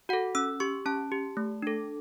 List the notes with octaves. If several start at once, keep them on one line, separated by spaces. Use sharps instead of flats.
F#4 A4 F#5
C#4 E6
G4 C#6
C#4 A5
G4
A3
D4 A4